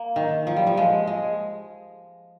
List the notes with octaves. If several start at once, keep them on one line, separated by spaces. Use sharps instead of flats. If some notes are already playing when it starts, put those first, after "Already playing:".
Already playing: A#3
D#3
F3
G3
F3
G#3
G#3